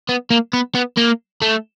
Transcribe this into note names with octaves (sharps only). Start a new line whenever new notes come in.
B3
A#3
B3
B3
A#3
A3